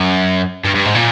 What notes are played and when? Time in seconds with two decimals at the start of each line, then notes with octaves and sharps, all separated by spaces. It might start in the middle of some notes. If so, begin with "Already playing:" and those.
Already playing: F#2
0.64 G2
0.75 G2
0.85 G#2
0.95 A#2